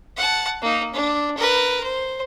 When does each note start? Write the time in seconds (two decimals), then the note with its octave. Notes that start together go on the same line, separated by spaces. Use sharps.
0.17 F#5 A5
0.62 A#3 D#4
0.93 D4
1.37 A#4 B4
1.84 C5